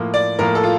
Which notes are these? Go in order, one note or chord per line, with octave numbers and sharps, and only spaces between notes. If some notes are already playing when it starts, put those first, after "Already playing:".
Already playing: A2 F3 A#3
D5
A2 F3 A#3 A#4
A4
F4